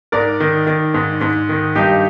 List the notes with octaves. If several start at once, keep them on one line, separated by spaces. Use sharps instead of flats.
G#2 A#4 D5
D#3
D#3
G#2
G#2
D#3
G2 D#4 G4